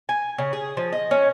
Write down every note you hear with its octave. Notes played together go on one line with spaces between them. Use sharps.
G#5
C#3
G#4
F3
D#5
C#4